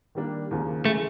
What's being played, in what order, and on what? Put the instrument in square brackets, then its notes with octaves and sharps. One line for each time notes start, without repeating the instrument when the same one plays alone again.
[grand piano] D#3 G3 A#3 D4
D#2 C#3 F3 A#3
[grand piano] C#3 E3 G#3 [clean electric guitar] A3